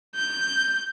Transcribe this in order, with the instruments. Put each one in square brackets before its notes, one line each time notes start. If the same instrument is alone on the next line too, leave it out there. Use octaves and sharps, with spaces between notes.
[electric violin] G6